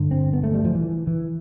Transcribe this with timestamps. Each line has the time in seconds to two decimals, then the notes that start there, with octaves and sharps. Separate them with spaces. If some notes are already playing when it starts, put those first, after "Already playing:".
Already playing: G2 D3
0.11 C4
0.33 B3
0.43 A3
0.54 G3
0.65 F3
0.75 E3
1.07 E3